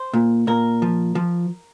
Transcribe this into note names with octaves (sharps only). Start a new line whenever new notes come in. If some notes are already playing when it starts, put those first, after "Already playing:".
Already playing: C5
A#2
A#2 A#4
F3
F3